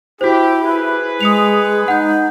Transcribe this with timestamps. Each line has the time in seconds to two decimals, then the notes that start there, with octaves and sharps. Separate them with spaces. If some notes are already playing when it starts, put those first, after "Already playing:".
0.21 E4 F#4 G4 C5
0.63 G#4 B4
1.21 G#3 D#6 C#7 F7
1.88 D#4 F#5 G6